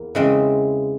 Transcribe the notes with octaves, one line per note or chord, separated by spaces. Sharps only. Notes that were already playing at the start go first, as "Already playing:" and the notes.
Already playing: E2 A#3
C#3 E3 G#3 C4